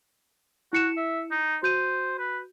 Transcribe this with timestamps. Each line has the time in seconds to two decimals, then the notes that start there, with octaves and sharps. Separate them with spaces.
0.73 E4 F#4 C#7 E7
0.97 E5
1.31 D#4
1.63 F#4 C5 G6 D#7
2.19 B4